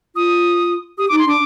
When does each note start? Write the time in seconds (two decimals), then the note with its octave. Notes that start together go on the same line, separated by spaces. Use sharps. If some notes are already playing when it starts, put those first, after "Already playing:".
0.16 F4 D#6
0.98 G4 D#6
1.09 D#4 D6
1.19 C6
1.26 D4 D6